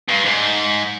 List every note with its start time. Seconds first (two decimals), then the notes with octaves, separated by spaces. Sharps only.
0.08 G2
0.25 G#2